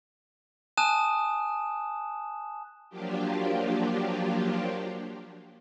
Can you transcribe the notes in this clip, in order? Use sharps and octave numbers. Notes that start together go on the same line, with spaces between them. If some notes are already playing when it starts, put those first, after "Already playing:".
G#5 A5 D#6 F#6 E7
F3 F#3 A#3 D4 F4 G4